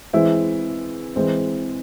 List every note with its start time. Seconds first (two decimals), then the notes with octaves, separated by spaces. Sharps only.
0.13 E3 G#3 C4 E4
1.16 E3 G#3 C4